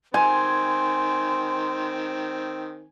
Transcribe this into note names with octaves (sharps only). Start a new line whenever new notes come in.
D#3 C4 G#5 C6